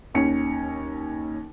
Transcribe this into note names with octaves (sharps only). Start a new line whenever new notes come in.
D#2 C#4 C#7